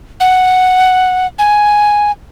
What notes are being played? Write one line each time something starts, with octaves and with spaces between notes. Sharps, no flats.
F#5
G#5